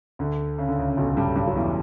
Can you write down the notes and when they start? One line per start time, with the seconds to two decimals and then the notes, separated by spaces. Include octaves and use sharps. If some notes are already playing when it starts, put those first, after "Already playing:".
0.19 D2 D3
0.58 C#3
0.69 D3
0.78 C#2 C#3
0.89 C#3
0.97 B1 B2
1.17 G2 G3
1.36 G2 G3
1.48 F#3
1.56 E2 E3